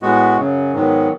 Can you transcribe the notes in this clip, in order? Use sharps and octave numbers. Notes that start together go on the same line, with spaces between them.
A2 G#3 B3 F#4
F#2 C#3 F#3
G#2 D#3 F#3 B3